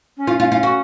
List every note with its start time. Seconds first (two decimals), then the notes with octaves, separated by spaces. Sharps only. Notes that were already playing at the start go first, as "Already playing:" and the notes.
0.17 C#4
0.27 F4
0.40 F4
0.52 F4
0.63 F#4